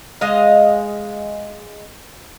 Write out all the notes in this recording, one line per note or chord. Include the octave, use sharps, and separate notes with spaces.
G#3 D#5 F5